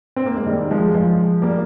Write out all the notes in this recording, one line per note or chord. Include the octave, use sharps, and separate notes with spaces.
C4
A#3
G#3
D#3 G3
F3 G#3
F3 G#3
G3 A#3